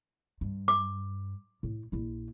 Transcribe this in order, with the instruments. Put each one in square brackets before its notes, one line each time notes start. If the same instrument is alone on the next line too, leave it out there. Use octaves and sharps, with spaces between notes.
[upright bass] G2
[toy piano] D6
[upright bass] A2
A#1 E4